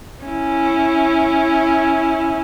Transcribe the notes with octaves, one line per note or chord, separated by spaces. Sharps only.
C#4 E4